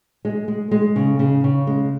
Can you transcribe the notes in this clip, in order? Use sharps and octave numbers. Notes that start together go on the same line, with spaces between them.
G#3
G#3
G#3
C#3
C#3
C#3
G#3